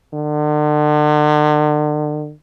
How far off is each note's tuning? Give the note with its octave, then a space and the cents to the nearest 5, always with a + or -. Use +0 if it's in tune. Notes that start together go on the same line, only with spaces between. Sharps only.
D3 +40